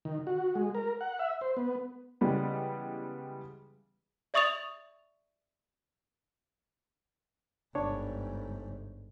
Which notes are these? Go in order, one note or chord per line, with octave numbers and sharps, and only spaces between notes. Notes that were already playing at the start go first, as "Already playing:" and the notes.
D#3
F#4
G#3
A#4
F#5
E5
C5
B3
C#3 E3 G3 G#3 B3
D5 E5 C#6 D#6 A6 F7
G1 G#2 D4 C#5